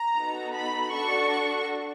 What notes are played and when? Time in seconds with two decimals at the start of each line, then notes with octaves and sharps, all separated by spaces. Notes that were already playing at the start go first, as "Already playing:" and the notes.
Already playing: A#5
0.16 B3 D#4 F#4 A4
0.54 B5
0.93 D4 F#4 A4 C#6